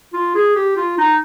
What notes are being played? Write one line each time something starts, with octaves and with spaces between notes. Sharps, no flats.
F4
G#4
G4
F4
D#4